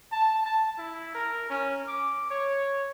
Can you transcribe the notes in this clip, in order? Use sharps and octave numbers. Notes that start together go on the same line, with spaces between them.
A5
A5
E4
A#4
C#4
D6
C#5